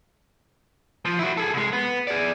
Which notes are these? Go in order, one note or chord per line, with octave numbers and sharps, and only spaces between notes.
F3
E4 F#4
G#4 A4
C2 G#3
B3
G#4 D5